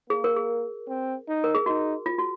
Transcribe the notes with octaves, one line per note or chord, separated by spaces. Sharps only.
A#3 G#4
A#4
G#4
C4
D#4
A#4
G#4
D#4 F#4
F4
F#4